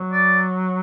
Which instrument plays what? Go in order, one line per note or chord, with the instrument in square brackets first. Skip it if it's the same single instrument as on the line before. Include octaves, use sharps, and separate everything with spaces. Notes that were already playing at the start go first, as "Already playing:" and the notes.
Already playing: [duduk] F#3
[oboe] D5